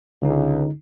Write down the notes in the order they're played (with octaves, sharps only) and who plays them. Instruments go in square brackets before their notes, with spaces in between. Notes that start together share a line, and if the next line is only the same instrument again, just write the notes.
[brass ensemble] C#2 [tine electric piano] D3 D#4